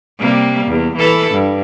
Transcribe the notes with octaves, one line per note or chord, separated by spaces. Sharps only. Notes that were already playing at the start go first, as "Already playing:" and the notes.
C3 G3 A#3
E2
E3 A4 B4
G2